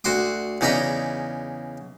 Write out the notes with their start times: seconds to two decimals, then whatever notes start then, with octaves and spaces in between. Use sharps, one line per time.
0.04 D2 F#4 F#5 C6 D6
0.61 E2 C#3 D#4 D5 A#5 B5